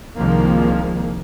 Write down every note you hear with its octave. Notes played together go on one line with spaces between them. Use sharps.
C2 D#3 F3 G#3 A#3